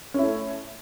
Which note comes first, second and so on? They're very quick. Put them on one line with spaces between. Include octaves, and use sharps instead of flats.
C#4 E4 A3